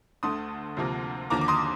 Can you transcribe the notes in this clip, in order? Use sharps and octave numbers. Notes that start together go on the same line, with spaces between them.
D2 D3 A3 C6 D#6
D2 C3 F3 A#3
D#2 D3 F3 A#3 A#5 D6
D6
C6 D#6